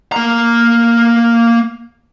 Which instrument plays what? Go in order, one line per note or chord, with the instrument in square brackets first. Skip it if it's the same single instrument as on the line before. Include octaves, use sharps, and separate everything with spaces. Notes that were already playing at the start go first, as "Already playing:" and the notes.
[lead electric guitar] A#3 A#5